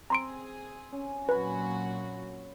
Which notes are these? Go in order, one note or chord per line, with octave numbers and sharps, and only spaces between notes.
C4 G#4 A#5 C6 D7
C#4
A#2 F#3 F#4 B4 G#5 B5